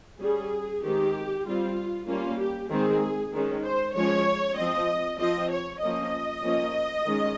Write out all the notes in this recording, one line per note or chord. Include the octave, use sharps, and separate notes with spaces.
G3 C#4 G#4
D#3 G#3 C4 G4
G3 C4 F4
G3 A#3 C#4 F4
G4
D#3 G#3 C4 G#4
D#3 G#3 C#4
C5
F3 G#3 C#4 C#5
F3 C4 D#5
F3 C4 D#5
C#5
F3 A#3 C#4 D#5
F3 A#3 C#4
D#3 G#3 C#4